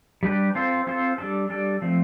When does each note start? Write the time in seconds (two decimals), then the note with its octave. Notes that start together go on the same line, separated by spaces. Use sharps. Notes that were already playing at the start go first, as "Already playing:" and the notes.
0.23 G3 D4 G4 B4
0.55 C4 F4 A4 C5
0.87 C4 F4 A4 C5
1.18 G3 D4 A4
1.50 G3 D4 A4
1.82 F3 A3 C4